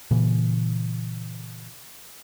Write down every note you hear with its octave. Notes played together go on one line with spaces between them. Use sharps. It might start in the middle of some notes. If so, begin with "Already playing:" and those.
A#2 C#3 E3